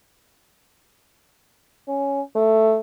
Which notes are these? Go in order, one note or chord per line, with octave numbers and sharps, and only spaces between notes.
C#4
A3